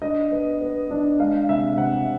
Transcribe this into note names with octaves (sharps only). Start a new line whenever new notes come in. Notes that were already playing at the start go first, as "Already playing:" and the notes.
D4 D#5
B3
B3
D4
G#3 F5
C3 E5
C3 F#5